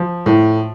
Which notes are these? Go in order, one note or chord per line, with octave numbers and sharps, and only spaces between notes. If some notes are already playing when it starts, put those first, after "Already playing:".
Already playing: F3
A2